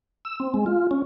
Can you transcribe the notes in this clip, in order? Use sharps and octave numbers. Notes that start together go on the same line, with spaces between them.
E6
C4
G#3
F4
C#4